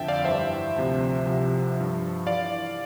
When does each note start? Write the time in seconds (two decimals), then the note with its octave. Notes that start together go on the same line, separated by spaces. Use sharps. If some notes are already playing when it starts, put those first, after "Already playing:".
Already playing: F2 D3 F3 E5 G5 A5
0.08 D5 F5
0.25 G2 E3 C5 E5
0.76 D2 C3 F3
1.25 C2 C3 F3
1.77 G2 F3
2.27 E3 D5 F5